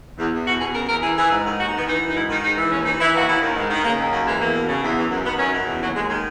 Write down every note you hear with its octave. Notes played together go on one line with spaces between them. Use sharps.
E2
E2
B2 F#4
B2 G#4
C#3 A#4
E2 A#4
E3 G#4
E3 G#4
G#2
D#3
D#2 F#4
D#4
D#3 B3
E3 D#4
F#2
D#4
G#2 E4
D#3 D#4
G#2 D#4
E3
D#2 C#4
E3 D#4
E3 E4
D#2 F#4
D#2 E4
D#3
G#2
D#3
C#3 A#3
D#2
F#2 F#3
E3 G#3
E2 A#3
B2
C#3
E2
E3
F#2
D#3 B3
F#2 C#4
B2
E2
D#2 F#3
D#2 G#3
D#3 G#3